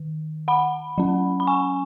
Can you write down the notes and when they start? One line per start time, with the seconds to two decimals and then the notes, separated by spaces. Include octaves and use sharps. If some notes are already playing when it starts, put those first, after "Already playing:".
Already playing: D#3
0.48 F#5 B5
0.98 F#3 C#4
1.40 B5
1.47 G#5 C#6